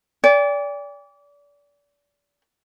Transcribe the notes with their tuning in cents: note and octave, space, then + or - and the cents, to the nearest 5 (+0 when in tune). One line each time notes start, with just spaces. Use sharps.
D5 -30 G5 +45